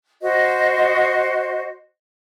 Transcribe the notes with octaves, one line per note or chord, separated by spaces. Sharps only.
F#4 C5 D#5